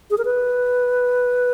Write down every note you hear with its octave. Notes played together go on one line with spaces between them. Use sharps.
G#4
A#4
B4